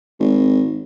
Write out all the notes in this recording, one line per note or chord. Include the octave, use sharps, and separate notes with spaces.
G#1